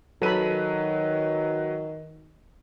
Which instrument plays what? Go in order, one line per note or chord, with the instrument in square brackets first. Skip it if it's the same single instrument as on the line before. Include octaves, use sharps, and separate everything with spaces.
[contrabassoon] D#3 [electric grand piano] F#3 B4 D#7 [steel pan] A4 B5